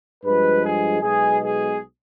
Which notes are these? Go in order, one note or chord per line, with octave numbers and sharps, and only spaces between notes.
G2 F3 G#3 B4
G#4
B1 B2 G#3 G#4
G#4